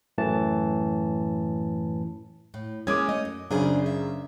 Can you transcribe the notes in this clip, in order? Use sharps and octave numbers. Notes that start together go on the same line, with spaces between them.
F#2 A2 E3 A5
A2
G#3 A#3 C#4 D6 D#6 G#6
A3 C#4 D#5
F#2
F#2 C#3 D4 G#4 C5
E5